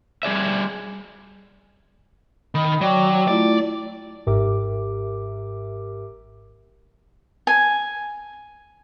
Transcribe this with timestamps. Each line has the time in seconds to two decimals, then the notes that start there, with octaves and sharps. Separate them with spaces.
0.23 G3 G#4 D5 E5
2.55 D#3 B5
2.81 F#3 D5 G5 D6
3.28 A3 E4 F4 D5
4.26 G#1 G#2 G4 A#4 E5 D6
7.47 G#5